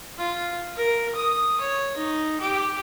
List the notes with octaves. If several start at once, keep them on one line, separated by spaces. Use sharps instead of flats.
F4
A#4
D#6
C#5
D#4
G4